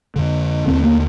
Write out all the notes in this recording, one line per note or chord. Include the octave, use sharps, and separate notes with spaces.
F2 D3
D#2 D3 C4
A#3